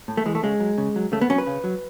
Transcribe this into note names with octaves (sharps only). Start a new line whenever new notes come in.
A2
A3
E3 G#3
A3
C#3 G#3
F#3
C#3
F#3
C#3 A3
B3
F#3 C#4
B4
C#3
F#3